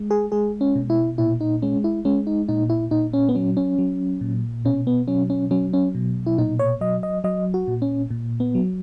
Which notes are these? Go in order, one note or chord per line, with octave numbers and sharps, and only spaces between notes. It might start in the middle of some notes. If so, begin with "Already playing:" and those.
Already playing: G#3
G#4
G#3 G#4
C#4
B2
E4
A#2 E4
D#4
G#3 C#4
E4
G#3 C#4
D#4
A#2 D#4
E4
A#2 D#4
C#4
B3
F#3 C#4
C#4
F#3
A#2
B2 C#4
B3
F#3 C#4
C#4
F#3 C#4
C#4
B2
E4
A#2 D#4
C#5
F#3 D#5
D#5
F#3 D#5
F#4
A#2
C#4
A#2
B3
F#3